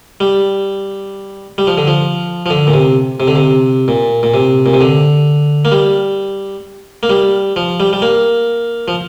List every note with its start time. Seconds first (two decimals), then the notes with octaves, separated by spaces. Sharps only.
0.20 G3
1.58 G3
1.67 F3
1.78 D3
1.87 F3
2.46 F3
2.50 D3
2.67 A#2
2.74 C3
3.20 C3
3.28 D3
3.35 C3
3.88 A#2
4.23 A#2
4.34 C3
4.66 A#2
4.73 C3
4.81 D3
5.65 A#3
5.72 G3
7.03 A#3
7.10 G3
7.56 F3
7.80 G3
7.93 G3
8.02 A#3
8.88 F3